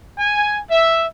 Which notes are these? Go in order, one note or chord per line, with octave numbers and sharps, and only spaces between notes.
G#5
E5